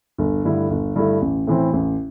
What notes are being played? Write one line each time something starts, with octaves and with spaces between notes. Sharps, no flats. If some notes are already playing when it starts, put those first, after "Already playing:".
G1
G2 D3 A3 E4
G1
G2 D3 A3 E4
A1
A2 E3 A3 C4
A1